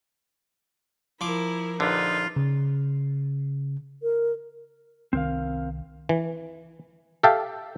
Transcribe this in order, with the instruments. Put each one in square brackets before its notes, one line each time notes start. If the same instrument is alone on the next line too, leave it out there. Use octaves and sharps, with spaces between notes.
[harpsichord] F3 D6 [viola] E4 A#4
[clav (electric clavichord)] A#1 D3 [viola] D#4 B4 [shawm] F4
[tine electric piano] C#3
[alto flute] A#4
[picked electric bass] C2 D#3 [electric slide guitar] C4 A#4 F5
[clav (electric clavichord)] E3
G4 A4 E5 F5 G5 A5